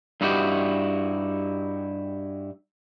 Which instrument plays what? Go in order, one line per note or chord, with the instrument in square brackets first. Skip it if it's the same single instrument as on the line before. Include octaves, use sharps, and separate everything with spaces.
[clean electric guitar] G2 D#4 E4 F#4 G4